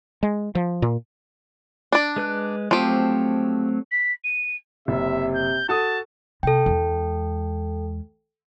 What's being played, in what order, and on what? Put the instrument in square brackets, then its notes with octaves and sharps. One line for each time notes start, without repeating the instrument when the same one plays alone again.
[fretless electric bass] G#3
F3
A#2
[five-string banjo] D4 D5
[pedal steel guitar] G#3 B4 F#6
[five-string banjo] F3 G4 [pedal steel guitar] F#3 A3 C4
[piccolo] B6
D#7
[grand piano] F#1 [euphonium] C3 [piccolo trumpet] E5
[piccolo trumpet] G6
[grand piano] F#4 A4 D#6 [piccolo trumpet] A5
[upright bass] C3 [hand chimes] A4 G5
[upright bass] E2 G#3